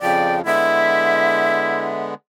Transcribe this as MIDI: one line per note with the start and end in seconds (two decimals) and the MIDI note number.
0.01 0.42 41
0.01 0.42 49
0.01 0.42 53
0.01 0.34 74
0.01 0.39 79
0.46 2.14 50
0.46 2.14 56
0.46 2.14 59
0.46 1.91 64
0.46 2.03 76